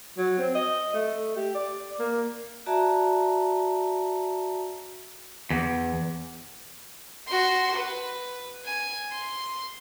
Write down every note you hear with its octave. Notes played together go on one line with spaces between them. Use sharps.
F#3
C4
D#5
A3
G4
D5
A#3
F#4 D5 E5 A5 A#5
E2
F#4 C6
B4
G#5
C6